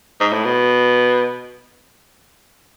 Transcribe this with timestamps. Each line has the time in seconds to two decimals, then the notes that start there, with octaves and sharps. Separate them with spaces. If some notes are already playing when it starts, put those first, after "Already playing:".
0.20 G#2
0.33 A2
0.44 B2